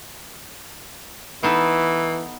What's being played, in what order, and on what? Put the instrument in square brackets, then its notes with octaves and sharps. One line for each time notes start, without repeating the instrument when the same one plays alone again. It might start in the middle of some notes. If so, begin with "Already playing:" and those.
[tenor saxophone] E3 [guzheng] B3 D#4 A4